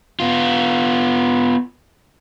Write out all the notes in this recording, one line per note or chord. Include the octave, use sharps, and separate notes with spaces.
B3 F4